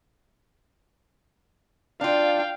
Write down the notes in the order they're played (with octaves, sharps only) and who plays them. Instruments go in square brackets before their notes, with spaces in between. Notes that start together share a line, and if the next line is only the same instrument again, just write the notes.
[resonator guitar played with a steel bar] D4 F4 [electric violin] F5 G5